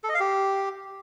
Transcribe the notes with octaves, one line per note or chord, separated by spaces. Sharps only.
A4
D#5
F5
G4